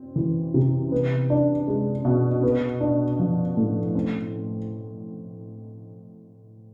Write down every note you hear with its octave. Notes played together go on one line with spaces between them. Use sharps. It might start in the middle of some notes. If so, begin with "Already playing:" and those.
Already playing: C4
E3
C3
B3
D4
G#3
B2
B3
D4
F3
A2
C4